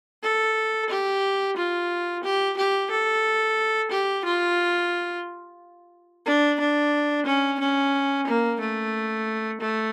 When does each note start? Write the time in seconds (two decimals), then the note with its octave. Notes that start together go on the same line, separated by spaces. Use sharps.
0.23 A4
0.90 G4
1.56 F4
2.24 G4
2.57 G4
2.91 A4
3.91 G4
4.25 F4
6.26 D4
6.59 D4
7.26 C#4
7.59 C#4
8.27 A#3
8.60 A3
9.61 A3